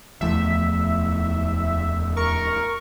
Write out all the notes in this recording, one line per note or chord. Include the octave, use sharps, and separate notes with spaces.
D1 E2 F3 A3 B3 E5
A#4 C#6